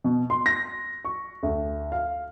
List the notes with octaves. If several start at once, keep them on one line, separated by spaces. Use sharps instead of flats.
B2
C6
A#6
C#6
D2
F5